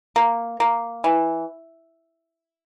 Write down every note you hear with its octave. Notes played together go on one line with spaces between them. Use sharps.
A#3
A#3
E3